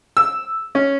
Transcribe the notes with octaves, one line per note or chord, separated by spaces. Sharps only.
E6
C#4